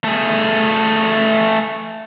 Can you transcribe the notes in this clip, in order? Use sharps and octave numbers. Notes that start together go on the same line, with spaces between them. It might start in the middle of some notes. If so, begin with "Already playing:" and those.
A3 G#4